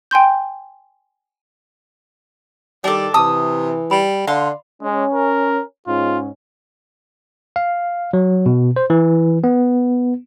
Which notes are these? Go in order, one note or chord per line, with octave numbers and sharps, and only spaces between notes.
G5 G#5 C6 G6
D#3 G3 D4 A4
C3 E3 A5 D#6 E6
G3 B5
D3 D5 F5 C6
G#3 C#4
A#4
G#2 C#4 F4
F5
F#3
B2
C5
E3
B3